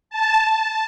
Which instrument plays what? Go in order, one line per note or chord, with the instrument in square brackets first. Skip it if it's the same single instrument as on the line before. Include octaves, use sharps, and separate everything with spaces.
[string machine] A5